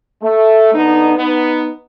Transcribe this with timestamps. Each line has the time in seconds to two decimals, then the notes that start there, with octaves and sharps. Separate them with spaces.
0.22 A3
0.74 D3 B3 D#4
1.17 B3 D#4